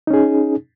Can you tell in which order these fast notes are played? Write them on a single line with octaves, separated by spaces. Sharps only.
D#4 C#4 G#4